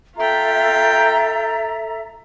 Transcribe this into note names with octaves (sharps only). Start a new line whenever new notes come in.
F4 A4 E5 G5 A#5